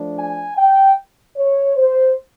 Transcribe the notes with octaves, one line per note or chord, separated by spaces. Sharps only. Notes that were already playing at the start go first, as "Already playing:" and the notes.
Already playing: F3 A3 D4
G#5
G5
C#5
C5